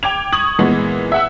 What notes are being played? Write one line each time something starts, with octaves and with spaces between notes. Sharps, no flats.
G5 D6 G#6 F7
C#6 D#6 G#6 F#7
A#2 E3 G#3 B3
E5 F#5 E6